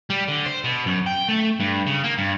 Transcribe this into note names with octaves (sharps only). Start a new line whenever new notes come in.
G3
D3
C5
B2
F#2
G5
A3
G2
C#3
A#3
G2